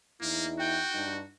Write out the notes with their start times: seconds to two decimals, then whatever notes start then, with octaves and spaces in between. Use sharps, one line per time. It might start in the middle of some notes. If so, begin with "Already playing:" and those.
0.21 E2 A#3 D#4 E4
0.59 F#4 G5
0.93 G2 D#4